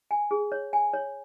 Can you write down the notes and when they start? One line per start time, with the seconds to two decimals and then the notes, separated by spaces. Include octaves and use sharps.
0.11 G#5
0.31 G#4
0.52 C#5
0.73 G#5
0.94 C#5